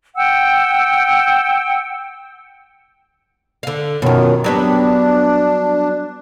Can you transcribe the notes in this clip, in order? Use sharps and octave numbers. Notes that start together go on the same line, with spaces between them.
F#5 G5 E6
D3 F5
F#2 B2 D#3 F3 F#3
F#3 G3 B3 D4